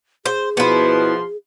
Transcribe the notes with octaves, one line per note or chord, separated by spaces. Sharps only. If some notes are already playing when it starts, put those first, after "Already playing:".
G#4 C5
B2 F3 B3 E4 C6